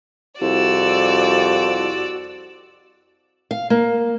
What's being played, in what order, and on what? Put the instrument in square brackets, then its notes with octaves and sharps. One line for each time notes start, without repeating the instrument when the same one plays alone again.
[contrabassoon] C2 [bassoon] F2 [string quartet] F#4 D5 E6
[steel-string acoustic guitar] F5
A#3